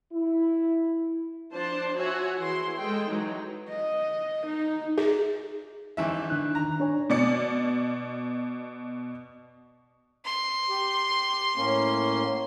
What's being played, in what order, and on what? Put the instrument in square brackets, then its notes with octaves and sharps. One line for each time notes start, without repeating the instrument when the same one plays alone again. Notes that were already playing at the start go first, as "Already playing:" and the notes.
[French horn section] E4
[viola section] F3 D4 C5 A5 C6
F#4 C#5 E5 G#5
E3 E4 G#4 C6
G#3 A4 G5
E3 F#3 G#3 D#4
[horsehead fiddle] D#5
D#4
[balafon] G#4
[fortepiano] G#1 E3 E5
[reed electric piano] D#3 D4 F#6
[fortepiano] A#5
[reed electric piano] D4 C#5 G#5
[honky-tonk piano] B2 D5 C#7
[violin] C6
[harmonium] G4
A2 A#3 C#4